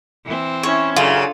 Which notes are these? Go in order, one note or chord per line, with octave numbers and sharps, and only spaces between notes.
E3 C4
C#4 E4 C#5
F#2 C#3 D4 F4 A4